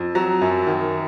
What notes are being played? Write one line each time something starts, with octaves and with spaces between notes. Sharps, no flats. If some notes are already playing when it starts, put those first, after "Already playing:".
Already playing: F2
F#3 A#5
F#2
D#3